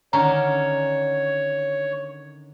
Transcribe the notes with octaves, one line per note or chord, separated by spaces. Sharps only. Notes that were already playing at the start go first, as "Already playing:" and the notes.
D3 D#3 C#4 C#5 A#5